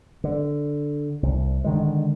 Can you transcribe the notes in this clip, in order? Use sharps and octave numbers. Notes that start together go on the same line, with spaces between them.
D3
C2
D3 D#3 G#3